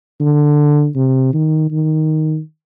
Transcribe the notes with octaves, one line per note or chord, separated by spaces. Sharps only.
D3
C3
D#3
D#3